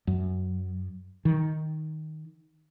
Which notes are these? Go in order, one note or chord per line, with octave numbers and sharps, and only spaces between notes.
F#2
D#3